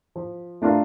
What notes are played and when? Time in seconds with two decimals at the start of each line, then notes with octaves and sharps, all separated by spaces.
0.16 F3
0.62 A3 D4 F4 A#4